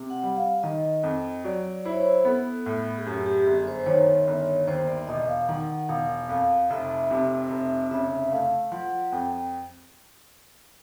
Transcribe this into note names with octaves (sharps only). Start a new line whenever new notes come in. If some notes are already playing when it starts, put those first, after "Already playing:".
Already playing: C3
F#5
G3
F5
D#3 D#5
F2
F#3 D5
E4 C5
C#5
C5
B3 A4
A2
G#4
F#2 G4
G4
G4
G1 G#4
C5
C5
D#3 C#5
G1
D#2 C5
D5
E1 D#5
F5
D#3 F#5
E1 F5
F2 F5
F1 E5
C3
F1
C#3 E5
A3 F5
F3 F#5
F2 G5